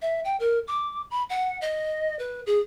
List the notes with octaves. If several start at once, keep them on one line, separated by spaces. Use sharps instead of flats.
E5
G5
A#4
D6
B5
F#5
D#5
B4
G#4